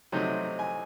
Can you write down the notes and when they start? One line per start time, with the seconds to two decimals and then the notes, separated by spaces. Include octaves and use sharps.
0.12 C3 F#3 A3 C4 D#4 C5
0.59 G#5